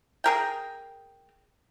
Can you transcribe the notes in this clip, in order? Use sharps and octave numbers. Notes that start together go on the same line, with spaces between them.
G#4 A#4 G5